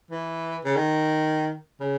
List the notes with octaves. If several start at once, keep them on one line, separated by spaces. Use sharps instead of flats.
E3
C#3
D#3
C#3